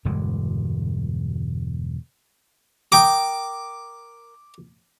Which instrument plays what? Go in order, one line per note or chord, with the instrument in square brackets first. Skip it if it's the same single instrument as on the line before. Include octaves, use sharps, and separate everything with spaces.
[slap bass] E1 G2 D3 G#3
[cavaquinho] A#4 G5 D#6 [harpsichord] D6